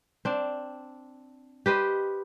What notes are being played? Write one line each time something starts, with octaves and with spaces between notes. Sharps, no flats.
C4 D4
G4 B4 C5 D#5